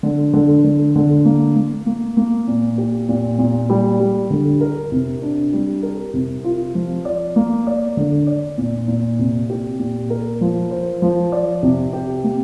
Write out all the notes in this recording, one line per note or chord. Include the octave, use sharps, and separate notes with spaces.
D3
D3
D3
D3
A#3
A#3
A#3
A#3
A#2
G4
A#2
A#2
G3
G3
D3
A#4
C3
D4
G3
A#4
C3
F4
F3
D5
A#3
D5
D3
D5
A#2
A#2
C3
G4
A#2
A#4
F3
C5
F3
D5
C3
G4
A#3